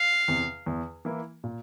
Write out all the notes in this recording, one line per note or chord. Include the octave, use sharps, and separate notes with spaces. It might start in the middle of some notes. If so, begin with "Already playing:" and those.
Already playing: F5
E2 C3
E2
E3 A#3 E4
A#2